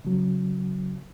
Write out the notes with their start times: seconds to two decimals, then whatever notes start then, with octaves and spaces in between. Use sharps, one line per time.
0.05 C#3 F#3